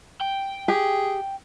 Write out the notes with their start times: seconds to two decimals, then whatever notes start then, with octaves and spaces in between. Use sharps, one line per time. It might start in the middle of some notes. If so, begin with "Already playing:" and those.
0.21 G5
0.68 G4 G#4